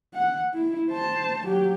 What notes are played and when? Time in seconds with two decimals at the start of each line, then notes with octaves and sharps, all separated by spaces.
0.14 F#5
0.54 E4
0.90 C5 A5
1.44 F#3 G4